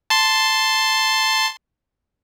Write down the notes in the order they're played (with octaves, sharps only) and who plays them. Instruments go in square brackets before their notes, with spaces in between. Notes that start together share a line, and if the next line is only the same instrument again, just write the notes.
[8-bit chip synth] A5 C6